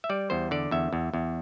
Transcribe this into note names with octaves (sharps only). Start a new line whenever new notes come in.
E5
G3 D5
E2 C5
D3 D5
E2 E5
E2
E2